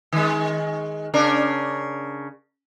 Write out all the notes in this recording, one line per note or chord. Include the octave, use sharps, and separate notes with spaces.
D#3 G#3
C#3 D4 A#4